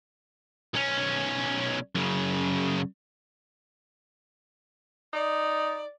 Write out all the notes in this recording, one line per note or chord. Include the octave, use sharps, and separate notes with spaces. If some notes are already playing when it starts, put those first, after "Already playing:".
B1 C#4
F#2 C#3
D#4 D5